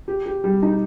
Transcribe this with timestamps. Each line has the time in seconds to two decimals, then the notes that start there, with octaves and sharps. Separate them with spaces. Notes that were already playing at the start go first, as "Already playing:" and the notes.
0.08 G4
0.26 G4
0.44 G3
0.62 D#4